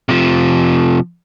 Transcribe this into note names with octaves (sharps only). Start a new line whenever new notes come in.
C3 F3